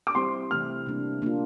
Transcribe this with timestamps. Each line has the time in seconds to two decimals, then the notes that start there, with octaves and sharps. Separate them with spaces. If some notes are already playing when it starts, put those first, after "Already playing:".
0.07 D6
0.15 G3 C4 E4 G4 C5 C6
0.51 C3 E3 A3 E4 F6
0.86 C3 G3 A#3 D4
1.22 A#3 D4 F4